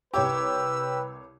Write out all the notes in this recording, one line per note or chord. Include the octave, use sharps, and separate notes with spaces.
C2 G4 B4 C#5 D6 E6